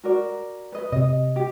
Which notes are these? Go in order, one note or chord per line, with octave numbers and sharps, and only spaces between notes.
F#4 A#4 D5
B4 D#5
C3 D#5
G4